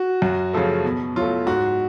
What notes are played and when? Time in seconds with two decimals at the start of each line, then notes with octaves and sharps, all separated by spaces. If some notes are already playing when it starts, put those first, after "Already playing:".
Already playing: F#4
0.22 F#2
0.53 C#3 F3 A3
0.84 B2
1.16 F#3 A3 F4
1.47 G#2 F#4